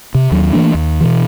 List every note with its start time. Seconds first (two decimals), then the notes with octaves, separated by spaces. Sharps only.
0.15 C3
0.31 D#2 F#3
0.53 E3 A3 A#3 D4
0.74 D#2
1.01 B2 E3